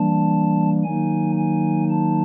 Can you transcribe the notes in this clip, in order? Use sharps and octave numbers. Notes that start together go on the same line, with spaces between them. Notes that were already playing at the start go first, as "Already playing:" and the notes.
Already playing: E3 G3 A#3 D4 A5
D#3 F#3 A#3 D#4 G#5
G#5
A5